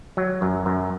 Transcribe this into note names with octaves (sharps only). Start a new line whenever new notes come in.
F#3
F#2
F#2